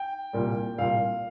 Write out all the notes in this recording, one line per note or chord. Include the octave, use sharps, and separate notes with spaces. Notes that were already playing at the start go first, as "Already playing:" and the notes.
Already playing: G5
C2 A#2 G3 A#3
C2 A#2 G3 A#3 F5